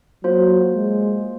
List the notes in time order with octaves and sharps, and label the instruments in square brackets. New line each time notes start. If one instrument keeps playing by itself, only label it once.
[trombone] F#3 [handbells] A#3 F4 C5
[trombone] G#3